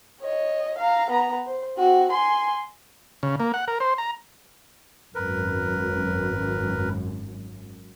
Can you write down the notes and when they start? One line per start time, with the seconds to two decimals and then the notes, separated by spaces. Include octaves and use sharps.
0.21 C#5 D#5
0.78 F5 A#5
1.11 B3 A#5
1.46 C5
1.78 C4 F#4
2.11 G#5 C6
3.23 C#3
3.40 A#3
3.54 F#5
3.68 A#4
3.80 C5
3.98 A#5
5.15 G#1 F#2 A#4 B4